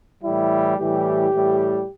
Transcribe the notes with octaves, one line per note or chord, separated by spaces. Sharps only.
A2 E3 G3 E4
A2 E3 G3 G4
A2 E3 G3